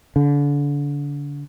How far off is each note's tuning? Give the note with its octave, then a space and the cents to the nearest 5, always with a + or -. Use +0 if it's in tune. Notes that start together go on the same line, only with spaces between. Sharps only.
D3 -35